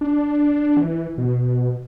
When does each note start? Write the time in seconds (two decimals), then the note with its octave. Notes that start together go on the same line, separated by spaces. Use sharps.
0.01 D4
0.77 E3
1.18 B2